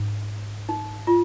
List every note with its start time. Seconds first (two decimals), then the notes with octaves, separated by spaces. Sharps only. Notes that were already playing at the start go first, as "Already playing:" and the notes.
Already playing: G#2
0.69 D#4
1.07 F4